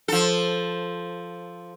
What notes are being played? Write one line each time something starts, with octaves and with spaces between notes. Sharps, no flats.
F3 A4